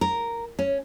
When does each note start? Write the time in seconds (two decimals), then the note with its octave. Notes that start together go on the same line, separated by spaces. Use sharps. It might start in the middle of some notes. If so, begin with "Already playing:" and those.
0.01 A#4
0.59 C#4